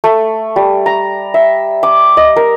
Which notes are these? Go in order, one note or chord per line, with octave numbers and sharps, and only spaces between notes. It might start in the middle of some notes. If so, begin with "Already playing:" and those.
A3
G3
A#5
E5
D6
D#5
A#4